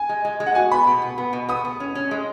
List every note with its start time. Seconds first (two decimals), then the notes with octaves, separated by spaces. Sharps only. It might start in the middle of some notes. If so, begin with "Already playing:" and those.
Already playing: G#5
0.09 G#3
0.25 G#3
0.40 G#3
0.46 F#5
0.55 F#4 G#5
0.71 B3 B5
0.87 B2
1.02 B3
1.18 B3
1.33 B2
1.49 B3 D#6
1.65 B3
1.80 C#4
1.95 C#4
2.11 G#3